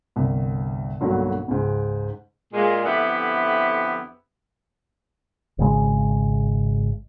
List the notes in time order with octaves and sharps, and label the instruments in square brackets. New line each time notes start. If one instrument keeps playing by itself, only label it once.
[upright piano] G1 C2
B1 G2 D3 F#3 A#3
C#2 G#2
[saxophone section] A#2 G#3
F2 D3 B3 E4 G4 E5
[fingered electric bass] G#1 C#3 G#3